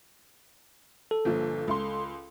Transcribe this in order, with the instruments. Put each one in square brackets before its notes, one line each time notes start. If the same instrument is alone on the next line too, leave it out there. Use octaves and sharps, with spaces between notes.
[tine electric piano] A4
[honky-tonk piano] G1 A#2 F3
C#2 C6